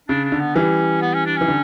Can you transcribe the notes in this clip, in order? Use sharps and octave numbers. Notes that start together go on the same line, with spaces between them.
C#3 D4
D4
D3
B3
E3 G3 C#4
B3
C#4
D4
E3 C#4
D3